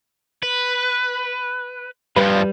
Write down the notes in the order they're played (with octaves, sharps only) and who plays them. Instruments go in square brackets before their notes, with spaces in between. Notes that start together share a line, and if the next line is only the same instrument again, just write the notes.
[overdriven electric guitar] B4
[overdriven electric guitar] G2 F3 [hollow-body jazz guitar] G3 B4